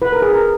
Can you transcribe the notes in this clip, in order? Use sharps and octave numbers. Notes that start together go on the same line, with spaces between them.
E4 B4
A#4
G#4
A#4